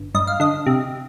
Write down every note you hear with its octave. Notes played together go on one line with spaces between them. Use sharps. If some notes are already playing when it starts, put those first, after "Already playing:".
Already playing: G1
G2 D#5
F5
D3 D#5
C3